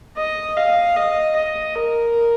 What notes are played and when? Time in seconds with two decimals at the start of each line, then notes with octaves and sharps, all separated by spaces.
0.17 D#5
0.56 F5
0.96 D#5
1.36 D#5
1.75 A#4